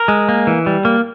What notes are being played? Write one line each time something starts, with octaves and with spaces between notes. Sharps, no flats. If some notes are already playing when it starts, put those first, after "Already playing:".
Already playing: A#4
G#3
A#3
E3
G3
A#3